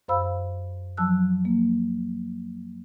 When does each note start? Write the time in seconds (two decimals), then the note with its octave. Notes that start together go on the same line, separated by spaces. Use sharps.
0.08 F#2 C5 F5 B5 E6
0.97 F3 F#3 A5 E6 F#6
1.45 A#3